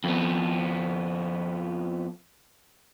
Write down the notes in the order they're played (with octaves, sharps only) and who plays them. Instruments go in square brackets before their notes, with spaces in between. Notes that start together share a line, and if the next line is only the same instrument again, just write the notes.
[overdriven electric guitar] F2 B3